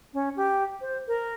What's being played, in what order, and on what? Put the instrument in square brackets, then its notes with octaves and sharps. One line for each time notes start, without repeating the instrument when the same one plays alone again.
[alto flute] C#4
G4
C5
A#4